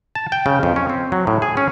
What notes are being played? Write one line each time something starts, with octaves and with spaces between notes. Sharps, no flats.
A5
G5
C#3
F2
C#4
C4
F#3
A2
G#4
C#4